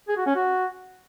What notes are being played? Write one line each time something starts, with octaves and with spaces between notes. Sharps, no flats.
G#4
F#4
C#4
F#4